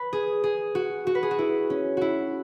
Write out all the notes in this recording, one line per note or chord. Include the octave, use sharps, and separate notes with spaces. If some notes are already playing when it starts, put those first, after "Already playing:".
Already playing: B4
G#4
G#4
F#4
F#4
B4
G#4
F#4
E4
C#4
E4 F#4